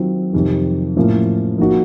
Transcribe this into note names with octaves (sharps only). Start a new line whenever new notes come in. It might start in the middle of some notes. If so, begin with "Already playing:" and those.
Already playing: D#3 F#3 C4 F4
F2 C3 D#3
A2 F3 A#3 C#4 F4
F3 A#3 D#4 F#4